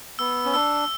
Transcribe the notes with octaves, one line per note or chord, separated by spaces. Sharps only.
B3 E6
C#4
D4 E6